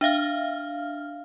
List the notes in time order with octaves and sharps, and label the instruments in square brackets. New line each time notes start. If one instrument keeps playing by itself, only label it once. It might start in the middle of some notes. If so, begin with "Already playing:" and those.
[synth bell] D4 E5 F5 F6